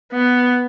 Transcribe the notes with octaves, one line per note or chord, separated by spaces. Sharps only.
B3